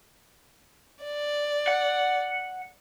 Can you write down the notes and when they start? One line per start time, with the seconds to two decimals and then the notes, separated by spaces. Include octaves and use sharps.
1.04 D5
1.67 F#5